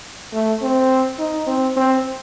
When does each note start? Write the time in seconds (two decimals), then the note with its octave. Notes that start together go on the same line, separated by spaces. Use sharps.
0.33 A3
0.61 C4
1.19 D#4
1.47 C4
1.76 C4